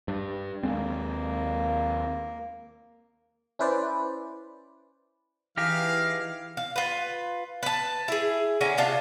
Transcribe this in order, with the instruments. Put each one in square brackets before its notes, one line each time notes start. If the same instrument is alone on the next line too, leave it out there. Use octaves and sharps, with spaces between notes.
[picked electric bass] G2
[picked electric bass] D#2 G#3 C4 [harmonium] A#3
[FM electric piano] C#4 E4 B4 C5 D5
[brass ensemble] E3 [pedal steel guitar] D#4 G4 G#4 [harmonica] F5 F6
[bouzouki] F5
F4 B4
B4 A5
E4 G#4
D3 C#4 G#5 A#5
C3 D4 F4 A5